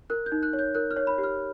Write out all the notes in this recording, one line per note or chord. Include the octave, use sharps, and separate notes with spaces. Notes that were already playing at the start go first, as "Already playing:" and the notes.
A#4 F#6
G6
D#4
F#6
C#5
G6
A#4 F#6
F6
C#5
B5
G4
F6